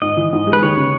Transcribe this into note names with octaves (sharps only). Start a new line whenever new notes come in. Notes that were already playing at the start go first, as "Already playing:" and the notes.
G#2 D#5
E3
G#2
G#3
B4
D#2 C#5
C#3